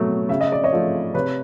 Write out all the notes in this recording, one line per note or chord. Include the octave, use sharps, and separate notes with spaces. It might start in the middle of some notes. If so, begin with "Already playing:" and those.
Already playing: B2 F#3 A3
C#3 E5
D#5
D5
C#5 D#5
F3 A3
C3 B4 C#5